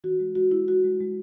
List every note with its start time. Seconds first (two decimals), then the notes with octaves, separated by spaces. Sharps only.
0.04 E3 F#4
0.20 G#3
0.36 G#3 F#4
0.51 G#3 E4
0.68 G#3 F#4
0.84 G#3
1.00 G#3